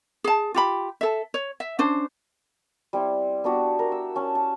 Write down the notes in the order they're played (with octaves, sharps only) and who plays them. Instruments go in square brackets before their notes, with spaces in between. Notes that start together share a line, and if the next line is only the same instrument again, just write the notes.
[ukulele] G#4 A5
F4 G4 B5
A4 E5
C#5
E5
C#4 D4 C5
[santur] G3 C4 E4
B3 D4 F#4 G4
A#4
E6
C#4 A5
A5